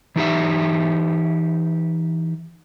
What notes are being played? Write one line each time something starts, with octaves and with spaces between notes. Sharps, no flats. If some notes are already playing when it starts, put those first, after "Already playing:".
E3 D#4 G4 E5